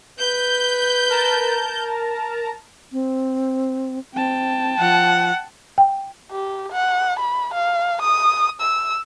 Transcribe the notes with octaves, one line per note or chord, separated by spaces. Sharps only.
B4 G6
A#4 A5 A#5
C4
C4 G5 A5
F3 F#5
G5
G4
F#5
B5
F5
D#6
E6